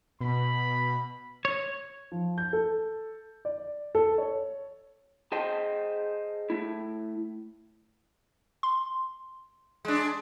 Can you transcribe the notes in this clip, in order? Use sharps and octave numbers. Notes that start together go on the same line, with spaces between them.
B2 B5
C#5
F3
G6
A4
D5
A4
C#5
G#4 C5 D#5 G5 A5 C6
A3 E4
C6
G#3 D4